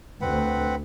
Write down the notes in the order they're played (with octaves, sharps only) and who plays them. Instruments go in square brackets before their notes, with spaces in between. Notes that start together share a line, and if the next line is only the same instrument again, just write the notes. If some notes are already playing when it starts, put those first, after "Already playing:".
[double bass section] D2 [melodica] C4 B4 F#5